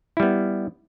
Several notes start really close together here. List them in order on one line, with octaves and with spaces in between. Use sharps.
E4 G3 B3